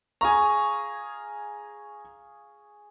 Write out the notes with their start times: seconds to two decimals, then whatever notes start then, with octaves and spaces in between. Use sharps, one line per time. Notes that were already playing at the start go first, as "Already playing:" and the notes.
0.21 G#4 F5 G#5 A#5 C#6